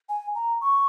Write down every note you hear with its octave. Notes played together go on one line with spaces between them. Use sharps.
G#5
A#5
C#6